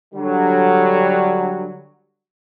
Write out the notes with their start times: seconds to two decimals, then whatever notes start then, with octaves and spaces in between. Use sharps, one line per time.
0.14 D3 F#3 G3